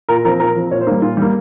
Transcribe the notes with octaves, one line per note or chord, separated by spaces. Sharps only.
A#2 A#4
F3 C4 A#4
A#2 A#4
F3 C4
A#2 C#5
C5
G3 A#3
A#2 F4
G3 A#3